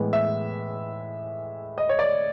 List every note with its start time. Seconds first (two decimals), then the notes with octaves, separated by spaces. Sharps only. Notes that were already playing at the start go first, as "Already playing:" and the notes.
Already playing: A2 E3 G#3 B3
0.13 E5
1.78 D#5
1.89 C#5
1.99 D5